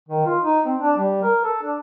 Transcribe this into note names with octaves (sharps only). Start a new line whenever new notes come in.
D#3
F4
D#4
C4
D4
G3
A#4
A4
D4